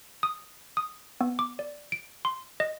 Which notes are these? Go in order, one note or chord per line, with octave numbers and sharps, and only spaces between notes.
D#6
D#6
B3
D6
D5
D7
C6
D#5